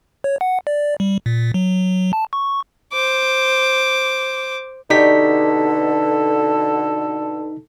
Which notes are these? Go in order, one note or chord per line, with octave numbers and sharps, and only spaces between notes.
C#5
F#5
D5
G3
A#2
F#3
F#3
A5
C#6
C5 D6
B2 D3 D#4 G4 A4 C#5 D5 B6